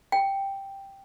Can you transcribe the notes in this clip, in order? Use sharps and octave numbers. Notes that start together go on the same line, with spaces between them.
G5